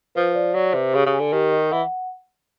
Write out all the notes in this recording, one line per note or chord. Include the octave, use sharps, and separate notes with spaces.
F3 B4
D5
F#3 D5
C3 B4
C#3 G4
C#3
G#5
D3
D#3 G4
D#5
E3 F#5